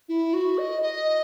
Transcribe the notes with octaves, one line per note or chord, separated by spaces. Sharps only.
E4
F#4
D#5
D#5